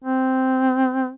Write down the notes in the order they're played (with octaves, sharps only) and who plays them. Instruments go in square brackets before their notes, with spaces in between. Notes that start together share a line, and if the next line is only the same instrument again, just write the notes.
[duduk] C4